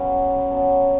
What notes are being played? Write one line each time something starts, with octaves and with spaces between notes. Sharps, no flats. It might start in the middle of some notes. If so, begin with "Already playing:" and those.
Already playing: C#3 F#3 B3 C#4 F#5 G#5
C#3 F#3 B3 A5